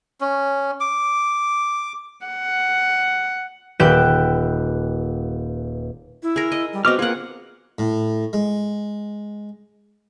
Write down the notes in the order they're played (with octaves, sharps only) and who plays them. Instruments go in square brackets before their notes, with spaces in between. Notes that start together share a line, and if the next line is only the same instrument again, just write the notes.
[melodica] C#4
D6
[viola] F#5
[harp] D#1 G4 B4 G6 D7 E7
[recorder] E4
[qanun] G#4 A#4
D#5
[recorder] G3
[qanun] B3 C4 [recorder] F#4 [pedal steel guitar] D#5 D6 F6
[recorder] A#3 [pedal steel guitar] F4 A#4 [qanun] G#4 F#5
[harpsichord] A2
G#3